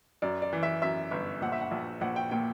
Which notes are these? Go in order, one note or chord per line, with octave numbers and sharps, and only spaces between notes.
F#2 D5
D5
E3
E5
F#2 E5
G1
A#1 F#5
E5
F#5
A#1
A#1 F#5
G5
A#2 G5